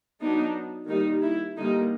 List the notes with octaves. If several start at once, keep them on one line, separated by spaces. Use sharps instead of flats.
F#3 B3 D4 D#4
D#3 G3 A#3 D#4
E4
D3 G3 A#3 D#4